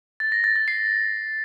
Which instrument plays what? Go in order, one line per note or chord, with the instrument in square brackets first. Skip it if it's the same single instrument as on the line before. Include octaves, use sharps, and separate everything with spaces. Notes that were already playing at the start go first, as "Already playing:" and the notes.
[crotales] A6
A#6
A6
A6
C7